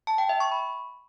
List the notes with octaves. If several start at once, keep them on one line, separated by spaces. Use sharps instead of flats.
A5
G5
E5
C#6
B5